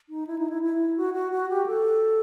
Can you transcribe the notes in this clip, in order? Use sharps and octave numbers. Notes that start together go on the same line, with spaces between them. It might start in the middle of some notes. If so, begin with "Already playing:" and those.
D#4
E4
D#4
E4
E4
F#4
F#4
F#4
G4
A4